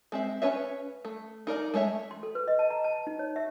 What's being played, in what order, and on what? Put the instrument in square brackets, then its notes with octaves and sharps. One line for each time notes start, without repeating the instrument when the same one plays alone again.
[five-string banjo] G#3 C4 E5
C#4 B4 C#5 E5
A3
D#4 A#4 D5 A#5
G#3 A3 C#5 E5
[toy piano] C6
A4
B4
D#5
A5
A#5
A5
D#4
C#5
E5